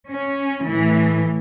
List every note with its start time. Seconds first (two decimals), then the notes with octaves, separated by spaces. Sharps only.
0.11 C#4
0.66 A2 E3